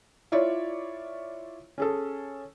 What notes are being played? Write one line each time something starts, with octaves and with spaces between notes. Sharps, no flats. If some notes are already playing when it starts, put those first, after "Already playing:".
E4 F4 C#5 D5
C#4 G#4 A4